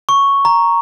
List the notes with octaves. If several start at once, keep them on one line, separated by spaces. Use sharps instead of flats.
C#6
A#5